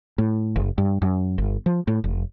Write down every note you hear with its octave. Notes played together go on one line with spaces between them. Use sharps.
A2
F#1
G2
F#2
G1
F3
A2
F1